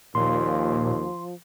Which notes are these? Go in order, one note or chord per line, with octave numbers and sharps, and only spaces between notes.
D#2 A#2 F3 C6